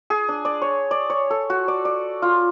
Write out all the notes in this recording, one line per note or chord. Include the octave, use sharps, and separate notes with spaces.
G#4
D4
D5
C#5
D5
C#5
A4
F#4
D5
D5
F4